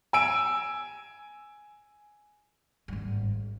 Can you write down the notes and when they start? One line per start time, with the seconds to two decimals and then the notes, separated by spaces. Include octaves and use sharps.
0.13 G#5 E6 D7
2.88 G#1 G2